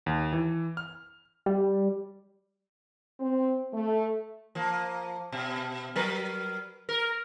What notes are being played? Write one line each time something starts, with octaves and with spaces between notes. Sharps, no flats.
D#2
E3
F6
G3
C4
A3
F3 A#3
B2
F#3 A#4 B4
A#4